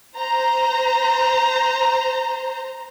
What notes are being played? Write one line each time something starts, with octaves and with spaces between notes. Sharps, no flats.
C5 A#5